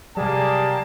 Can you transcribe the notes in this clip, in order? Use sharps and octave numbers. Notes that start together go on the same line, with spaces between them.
C3 F#3 G3 A#3 G#4 G5 A5